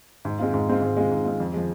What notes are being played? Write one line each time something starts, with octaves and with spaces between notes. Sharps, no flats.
G#2
G#3 C4 F4
G#2
G#3 C4 F4
G#2
G#3 C4 F4
G#2
G#3 C4 F4
F2
F3 G#3